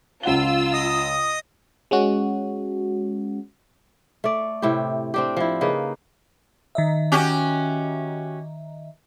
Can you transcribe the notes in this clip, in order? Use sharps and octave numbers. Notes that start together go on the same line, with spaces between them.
C#2 F4 F#5 E6 G7
D#5 D#6
G#3 C#4 F#4
A3 D5
A2 C3 E4 G4
C4 D4 G4
F3 E4
C#3 A#3 D#4 B4
D#3 D#5 E5
C#4 F#4 G4